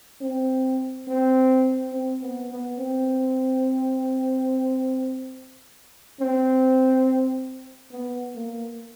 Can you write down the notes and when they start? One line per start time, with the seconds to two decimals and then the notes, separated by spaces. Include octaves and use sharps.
0.21 C4
1.08 C4
1.93 C4
2.21 B3
2.50 B3
2.79 C4
6.20 C4
7.91 B3
8.35 A#3